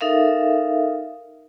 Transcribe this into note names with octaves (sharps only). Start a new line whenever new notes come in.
D#4 A4 A#4 E5 F5